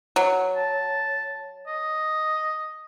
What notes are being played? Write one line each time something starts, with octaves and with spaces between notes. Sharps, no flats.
F#3
A5
D#5